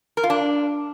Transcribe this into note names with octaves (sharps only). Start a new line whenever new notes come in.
A#4
F4
D4